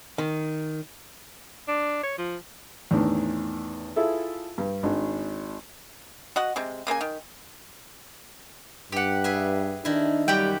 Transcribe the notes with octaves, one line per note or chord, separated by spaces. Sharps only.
D#3
D4
C#5
F3
E2 A2 D#3 D4
E4 F4 G#4 A4 E5
G2
G#1 D#3 D4
F#4 D#5 F#5
C3 G#3
C#3 A#3 F4 G#5
D#3
G2 G4 F#5
G#4 B4 E5
D#3 D4 E4
F#2 G3 G4 F#5 G5